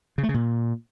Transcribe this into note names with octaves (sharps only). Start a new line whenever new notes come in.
C#3
A3
C#3
A#2